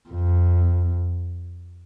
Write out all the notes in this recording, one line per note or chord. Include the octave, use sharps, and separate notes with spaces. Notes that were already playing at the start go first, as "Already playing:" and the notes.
F2